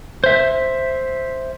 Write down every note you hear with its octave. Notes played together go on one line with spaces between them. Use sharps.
C5 E5